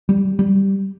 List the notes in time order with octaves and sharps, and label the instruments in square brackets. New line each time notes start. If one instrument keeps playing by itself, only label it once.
[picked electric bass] G3
G3